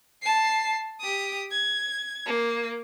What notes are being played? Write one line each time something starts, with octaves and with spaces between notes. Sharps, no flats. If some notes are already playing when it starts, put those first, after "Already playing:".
A5 C7
G4 D#6
G#6
A#3